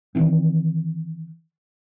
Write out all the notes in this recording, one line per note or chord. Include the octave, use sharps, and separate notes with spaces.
D#3 E3 C4